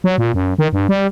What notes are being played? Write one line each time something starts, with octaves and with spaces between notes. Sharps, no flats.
F#3
A#2
F#2
D#3
G2
G3